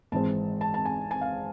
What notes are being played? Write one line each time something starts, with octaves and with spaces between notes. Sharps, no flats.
G#1 G#2 E3 G#3 C4 A5
A5
A5
G#5
G#5
F5